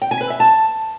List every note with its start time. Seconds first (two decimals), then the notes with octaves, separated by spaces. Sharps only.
0.02 G5
0.11 G#5
0.21 B4
0.30 E5
0.40 A5